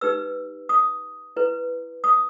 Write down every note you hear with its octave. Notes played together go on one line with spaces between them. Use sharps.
D#4 G4 B4 E6
D#6
E4 B4
D#6